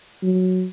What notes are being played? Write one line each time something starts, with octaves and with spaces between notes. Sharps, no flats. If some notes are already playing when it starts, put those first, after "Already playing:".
F#3